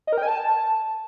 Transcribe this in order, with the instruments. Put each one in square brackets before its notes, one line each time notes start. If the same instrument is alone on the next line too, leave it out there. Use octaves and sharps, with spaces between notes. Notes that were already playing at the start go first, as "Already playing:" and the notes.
[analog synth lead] D#5
A#4
G5
G#5
A5